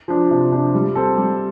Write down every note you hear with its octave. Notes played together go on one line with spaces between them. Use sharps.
F3 D4
C3
F3 D4
G3
C4 A4
G3